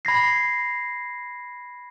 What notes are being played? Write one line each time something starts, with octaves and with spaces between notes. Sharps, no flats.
B5 G#6 A#6 C7